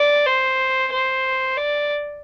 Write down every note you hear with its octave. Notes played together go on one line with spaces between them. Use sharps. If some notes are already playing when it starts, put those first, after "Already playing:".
Already playing: D5
C5
C5
D5